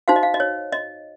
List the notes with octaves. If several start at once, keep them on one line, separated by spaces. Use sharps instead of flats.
D#4 F#4 C5 F5
D#5
F5
D#5
C#5
D#5